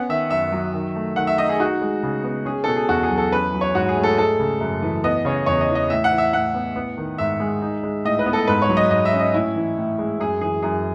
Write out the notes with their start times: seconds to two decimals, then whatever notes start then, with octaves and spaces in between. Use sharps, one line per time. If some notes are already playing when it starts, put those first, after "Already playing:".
Already playing: B3 C#4 F#5
0.09 D#3 E5
0.30 F#2 E5
0.52 F#3
0.74 D#3
0.95 A3
1.16 D#3 F#5
1.27 E5
1.38 D#4 D#5
1.49 G#4
1.60 D#4 F#4
1.81 G#3
2.03 C#3
2.24 B3
2.45 C#4 G#4
2.64 B2 A4
2.76 G#4
2.89 E2 F#4
3.03 G#4
3.10 F#3
3.18 A4
3.32 C#4 B4
3.54 F#3
3.61 C#5
3.74 G#2 F#4
3.89 G#4
3.97 A3
4.03 A4
4.18 G#3 A4
4.39 C#3
4.60 F#2
4.82 E3
5.04 B3 D#5
5.25 C#3 C#5
5.46 E2 C#5
5.61 D#5
5.69 E3
5.75 D#5
5.90 A2 E5
6.04 F#5
6.11 E3
6.18 E5
6.33 A2 F#5
6.54 B3
6.76 B3
6.98 D#3
7.18 G#2 E5
7.40 G#3
7.61 D#4
7.83 G#3
8.04 A2 D#5
8.19 B4
8.26 B3
8.33 A4
8.47 G#2 B4
8.62 C#5
8.69 F#3
8.77 D#5
8.90 G#2 D#5
9.05 E5
9.13 C#4
9.19 D#5
9.34 A2 E4
9.56 E3
9.78 A2
9.98 G#3
10.20 F#2 G#4
10.41 E3 G#4
10.62 F#2 G#4